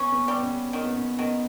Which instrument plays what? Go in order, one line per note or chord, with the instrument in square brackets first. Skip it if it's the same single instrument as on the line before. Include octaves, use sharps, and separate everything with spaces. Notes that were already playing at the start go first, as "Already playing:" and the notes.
Already playing: [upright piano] B3 [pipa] C#4
[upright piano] B3
[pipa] G3
[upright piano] B3
C#4
[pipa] D#3
[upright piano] B3
C#4
[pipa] D#3 [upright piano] B3